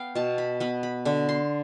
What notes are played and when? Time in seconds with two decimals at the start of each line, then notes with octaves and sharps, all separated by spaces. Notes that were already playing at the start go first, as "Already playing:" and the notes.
Already playing: B3 F5 G5
0.15 B2 A5
0.38 B5
0.60 B3 B5
0.83 B5
1.05 D3 B5
1.29 C6